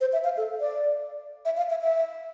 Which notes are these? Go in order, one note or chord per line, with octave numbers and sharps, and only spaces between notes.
C5
E5
F5
A4
D5
E5
F5
E5
E5